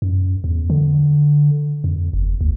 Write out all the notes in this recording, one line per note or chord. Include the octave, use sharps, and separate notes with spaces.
F#2
E2
D3
F2
F#1
D2